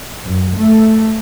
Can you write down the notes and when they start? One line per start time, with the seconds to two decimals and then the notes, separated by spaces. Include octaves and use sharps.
0.25 F#2
0.56 A3